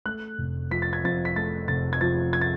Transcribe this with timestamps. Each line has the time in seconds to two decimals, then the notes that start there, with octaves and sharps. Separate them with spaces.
0.05 A3 F#6
0.38 F1
0.71 F3 B6
0.82 A6
0.93 G#6
1.04 F2 A6
1.25 B6
1.36 A3 A6
1.68 F1 A6
1.93 G#6
2.01 F3 A6
2.33 G#6
2.41 A6